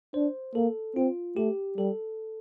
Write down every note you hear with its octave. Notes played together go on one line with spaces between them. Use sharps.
D4 C5
A#3 A4
C4 F4
A3 G4
G3 A4